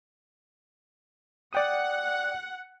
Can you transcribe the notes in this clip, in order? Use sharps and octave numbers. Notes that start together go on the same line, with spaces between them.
D5 F#5 G5 D#6